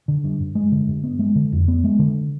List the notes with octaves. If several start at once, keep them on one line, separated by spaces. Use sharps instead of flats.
D3
G2
G2
G#3
D3
G2
B3
G#3
D3
F2
B3
G#3
D3